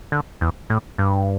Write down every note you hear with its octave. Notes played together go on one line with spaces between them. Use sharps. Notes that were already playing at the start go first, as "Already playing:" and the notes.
D3
E2
A2
G2